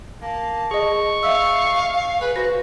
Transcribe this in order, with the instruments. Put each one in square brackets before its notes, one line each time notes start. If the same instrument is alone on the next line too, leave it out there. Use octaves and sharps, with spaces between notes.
[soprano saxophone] A#3 [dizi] A5
[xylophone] G#4 D#5 [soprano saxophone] C#6
[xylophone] E5 E6 [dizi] F5
[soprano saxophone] G#4 [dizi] B4
[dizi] F#4 [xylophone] B4 A#6 [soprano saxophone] C5